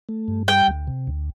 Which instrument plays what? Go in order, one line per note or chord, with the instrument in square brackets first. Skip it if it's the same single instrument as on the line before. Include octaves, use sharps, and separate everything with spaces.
[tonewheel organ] A3
G2
[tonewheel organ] G3 [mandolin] G5
[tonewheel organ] D2
C3
D2